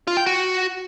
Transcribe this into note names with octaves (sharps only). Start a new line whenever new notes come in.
F4
G5
F#4